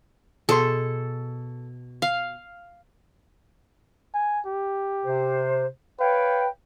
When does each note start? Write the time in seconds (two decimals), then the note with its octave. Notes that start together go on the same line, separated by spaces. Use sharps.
0.49 B2 G#4 A4 C6
2.02 F5
4.14 G#5
4.46 G4
5.05 C3 C5
5.99 B4 C#5 F5 G5